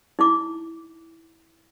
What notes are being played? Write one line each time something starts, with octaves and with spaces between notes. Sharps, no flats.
D#4 E4 D6